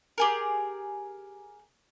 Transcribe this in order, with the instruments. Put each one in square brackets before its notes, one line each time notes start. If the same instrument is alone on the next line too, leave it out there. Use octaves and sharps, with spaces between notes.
[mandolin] G4 G#4 A#4